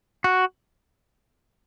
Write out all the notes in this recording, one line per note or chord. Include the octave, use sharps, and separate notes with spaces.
F#4